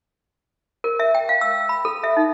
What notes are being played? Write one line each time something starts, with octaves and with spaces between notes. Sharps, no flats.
A#4
E5
G5
F5
E6
B5
A4
E5
D#4